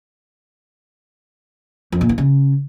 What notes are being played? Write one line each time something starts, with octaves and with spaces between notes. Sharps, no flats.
F2
A#2
E3
C#3